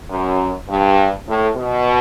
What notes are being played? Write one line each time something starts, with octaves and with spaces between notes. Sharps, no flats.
F#2
G2
A2
B2